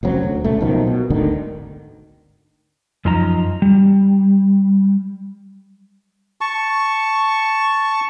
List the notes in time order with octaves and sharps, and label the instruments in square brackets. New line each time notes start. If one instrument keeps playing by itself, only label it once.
[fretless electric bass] F1 F#2 F#3 C4
D2
C#2 A#2 A3
B1 B2 D#3 F3
B2
G#1 D2 D3 D#3
[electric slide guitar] F#2 F3 D#4 A#5
G3
[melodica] A5 C#6